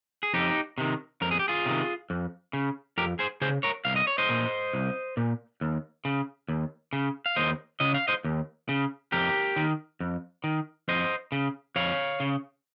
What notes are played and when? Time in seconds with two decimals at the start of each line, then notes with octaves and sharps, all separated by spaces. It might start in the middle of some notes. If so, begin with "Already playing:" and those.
0.23 G#4
0.34 F2 D#4 G4
0.78 C3 D#3
1.22 F2 A#4
1.31 G#4
1.39 G4
1.48 F4 G#4
1.66 C3 D#3
2.10 F2
2.53 C#3
2.98 F2 G4 A#4
3.19 G#4 C5
3.41 C#3 G#4 C5
3.63 A#4 C#5
3.85 C2 F5
3.96 D#5
4.07 C#5
4.18 C5 D#5
4.29 A#2
4.73 C2
5.17 A#2
5.61 D#2
6.05 C#3
6.48 D#2
6.93 C#3
7.26 F5
7.36 D#2 C5 D#5
7.80 C#3 D#5
7.94 F5
8.08 C5 D#5
8.24 D#2
8.69 C#3
9.12 F2 G4 A#4
9.56 D#3
10.00 F2
10.44 D#3
10.88 F2 C5 D#5
11.32 C#3
11.76 F2 C#5 F5
12.20 C#3